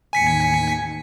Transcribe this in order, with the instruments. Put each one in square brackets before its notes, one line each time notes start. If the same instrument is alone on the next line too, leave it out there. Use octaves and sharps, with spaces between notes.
[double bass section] A1 D#2 [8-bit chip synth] G#5 B6 C#7